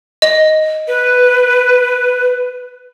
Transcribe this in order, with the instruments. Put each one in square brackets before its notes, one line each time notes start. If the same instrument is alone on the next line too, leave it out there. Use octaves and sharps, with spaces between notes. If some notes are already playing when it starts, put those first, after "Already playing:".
[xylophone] D#5
[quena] B4